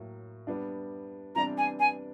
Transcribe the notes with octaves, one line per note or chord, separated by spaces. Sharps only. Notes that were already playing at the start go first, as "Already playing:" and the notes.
Already playing: A2 F#3 A#3
G3 B3 D4
C3 E3 G3 B3 D4 A#5
G#5
G#5